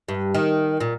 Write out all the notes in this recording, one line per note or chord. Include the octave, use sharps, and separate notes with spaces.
G2
D#3
A#2